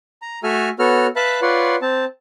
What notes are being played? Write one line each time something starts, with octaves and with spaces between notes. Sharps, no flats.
A#5
A3 F#4 A4 E5 G#5 F6
B3 F#4 A4 C#5 F6
B4 E5 F5 A5 B5 F#6
F4 B4 C#5 D5 F#5 C6
C4 A5